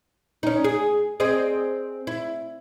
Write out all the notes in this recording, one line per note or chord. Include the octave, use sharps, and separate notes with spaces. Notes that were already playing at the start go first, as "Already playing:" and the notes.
C#4 D#4
G#4
C4 G#4 D#5
E4